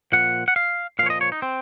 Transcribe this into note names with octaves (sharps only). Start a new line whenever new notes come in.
A#2 F3 F#5
F#5
F5
A#2 F3 C#5 F5
D#5
C#5
D#4
C4